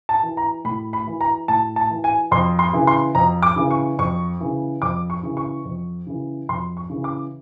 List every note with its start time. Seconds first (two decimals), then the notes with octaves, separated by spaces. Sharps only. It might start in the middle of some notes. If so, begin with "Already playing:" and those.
0.09 A5
0.23 E3
0.37 A#5
0.65 A2 B5
0.93 B5
1.07 E3
1.21 A#5
1.48 A2 A5
1.76 A5
1.90 E3
2.04 G#5
2.31 F2 C6
2.59 C6
2.73 C#3 E3
2.87 C6
3.15 F2 A#5
3.43 D6
3.56 C#3 E3
3.71 C#6
3.99 F2 C#6
4.41 C#3 E3
4.82 F2 D6
5.10 C#6
5.23 C#3 E3
5.37 C#6
5.65 F2
6.07 C#3 E3
6.49 F2 C6
6.77 C#6
6.90 C#3 E3
7.04 D6